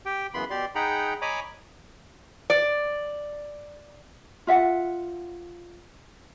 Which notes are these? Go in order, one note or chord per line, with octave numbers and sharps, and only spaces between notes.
G4 G5
F#2 C#3 E3 B3 B5 C6
B2 G4 D5 C6
D#4 G#4 F#5 G5 A#5 B5
C#5 D#5 G#5 A#5 B5 D6
D5
F4 E5 F#5